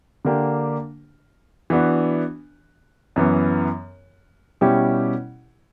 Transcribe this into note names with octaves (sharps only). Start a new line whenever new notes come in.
D3 A#3 D4 G4
E3 B3 D4 F#4
F#2 E3 B3
B2 G3 C#4 E4 G4